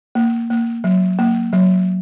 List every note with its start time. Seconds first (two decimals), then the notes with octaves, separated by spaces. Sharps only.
0.15 A#3
0.50 A#3
0.84 F#3
1.19 A#3
1.53 F#3